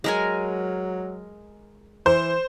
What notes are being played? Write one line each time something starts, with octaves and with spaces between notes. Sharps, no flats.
F#3 G#3 A#4 G#5
E3 C5